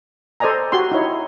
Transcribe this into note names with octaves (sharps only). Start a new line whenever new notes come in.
A4 C5 D5 D#5 G#5 A#5
F#4 G4 C6
D#4 E4 C#5